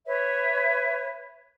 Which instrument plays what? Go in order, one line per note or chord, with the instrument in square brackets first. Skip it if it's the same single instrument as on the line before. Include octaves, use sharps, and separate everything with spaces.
[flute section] B4 C#5 E5